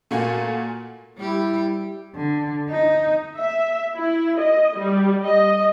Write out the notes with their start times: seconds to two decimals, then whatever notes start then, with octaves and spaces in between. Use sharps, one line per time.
0.11 A#2 A3 A#3 F#4 G#5
1.17 G3 E4 G4
2.16 D3
2.71 D#4
3.37 E5
3.95 E4
4.39 D#5
4.75 G3
5.24 D#5